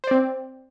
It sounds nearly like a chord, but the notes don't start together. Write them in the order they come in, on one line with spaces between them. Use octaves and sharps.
C5 D5 C4